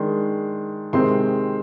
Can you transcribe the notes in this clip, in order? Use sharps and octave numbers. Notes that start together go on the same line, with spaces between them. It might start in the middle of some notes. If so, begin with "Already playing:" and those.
Already playing: D#3 G#3 D4 C6
C3 D#3 G#3 C4 C6